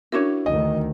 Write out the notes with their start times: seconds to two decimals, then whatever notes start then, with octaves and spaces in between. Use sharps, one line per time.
0.12 C#4 D4 E4 F#4 A#4 C#5
0.46 D2 D#3 D#5